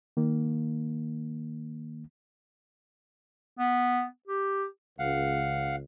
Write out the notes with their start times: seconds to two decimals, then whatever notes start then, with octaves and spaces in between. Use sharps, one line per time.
0.17 D#3 A#3
3.59 B3
4.28 G4
4.99 C#2 F5 F#5